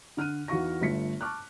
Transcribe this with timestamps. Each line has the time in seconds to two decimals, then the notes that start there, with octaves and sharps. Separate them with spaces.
0.17 D3 F6 F#6 D#7
0.48 E2 D#4 F#4 F5 C#6 A#6
0.81 G1 A3 F4 B6 C#7
1.21 A5 C#6 D6 F6 F#6